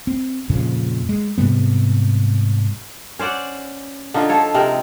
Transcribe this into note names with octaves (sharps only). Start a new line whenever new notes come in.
C4
F2 A#2 C#3 F3
G#3
G#2 C3 G3 B3
C#4 C5 D5 F#5
D3 D#4 F4
F3 A4 C#5
C3 G#3 C4 A#4